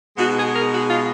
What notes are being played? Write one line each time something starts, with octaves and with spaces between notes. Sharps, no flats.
B2 G#3 B3 D#4 F#4
G#4
A#4
F#4
F4